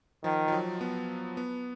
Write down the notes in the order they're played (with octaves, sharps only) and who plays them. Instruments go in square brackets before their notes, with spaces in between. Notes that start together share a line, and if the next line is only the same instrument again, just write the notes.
[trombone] D#3 [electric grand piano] F3
[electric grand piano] F3
F#3
B3
B3